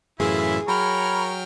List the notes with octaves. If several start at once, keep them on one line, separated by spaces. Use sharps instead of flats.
F#2 A2 E3 E4 F4 G#4 E5
F#3 A#4 C#5 G5 B5 F6